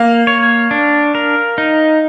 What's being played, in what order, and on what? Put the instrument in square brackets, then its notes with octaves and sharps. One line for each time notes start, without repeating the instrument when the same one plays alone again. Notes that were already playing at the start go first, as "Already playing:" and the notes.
Already playing: [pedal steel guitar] A#3 [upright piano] F5
[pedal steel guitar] C#5
D4
A#4
D#4